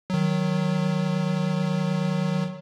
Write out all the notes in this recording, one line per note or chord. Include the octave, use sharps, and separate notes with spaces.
D#3 F#3